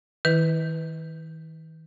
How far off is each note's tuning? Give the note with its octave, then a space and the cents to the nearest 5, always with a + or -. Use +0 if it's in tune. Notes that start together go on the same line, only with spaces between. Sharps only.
D#3 +40 E4 +0 B4 +10